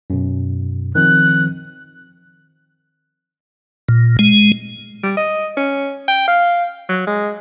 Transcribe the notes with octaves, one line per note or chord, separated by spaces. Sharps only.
F#2 B2
D#3 F3 C4 F#6
A#2
G#3
G3
D#5
C#4
G5
F5
F#3
G#3